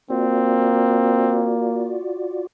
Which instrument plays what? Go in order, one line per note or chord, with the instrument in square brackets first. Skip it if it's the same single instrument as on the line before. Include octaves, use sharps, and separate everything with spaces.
[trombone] A#3 [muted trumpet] C4 [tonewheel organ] F4 F#4 D5